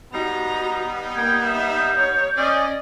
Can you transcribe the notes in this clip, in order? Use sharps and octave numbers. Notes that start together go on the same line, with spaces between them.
G3 B3 D#4 F#4 A#5
A#3 G5 G#6
E5 G6
C#5
C#4 G#4 D5 D#5